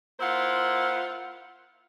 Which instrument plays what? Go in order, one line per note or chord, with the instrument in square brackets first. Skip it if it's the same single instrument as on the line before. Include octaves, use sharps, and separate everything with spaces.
[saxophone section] A#3 E4 F4 C5 F#5